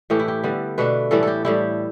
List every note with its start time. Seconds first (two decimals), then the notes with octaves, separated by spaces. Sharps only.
0.10 A2 E3 A3 G4
0.19 E4
0.28 G4
0.44 D3 G3 B3
0.78 B2 A3 D4 B4
1.11 A2 E3 G3 E4 A4
1.23 G4 A4
1.45 A2 G3 E4 G4